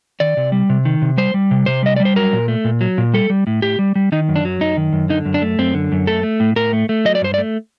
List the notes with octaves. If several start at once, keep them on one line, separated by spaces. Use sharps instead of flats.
D#3 D5
C3
G3
C3
D#3
C3
G3 C5
G3
C3
C3 C5
G3 D#5
G3 D5
C5
F#3 A#4
A#2
A3
A#2
F#3
A#2
G3 A4
G3
A2
A2 G4
G3
G3
D#3 D#4
F#2
D4
F#3
F#2 D#4
D#3
F#2
D3 D#4
F#2
D4
A3
F#2 C4
D3
F#2
A3 A4
A3
A2
A2 A#4
A3
A3
F#3 D#5
D5
G2 C5
D5
A3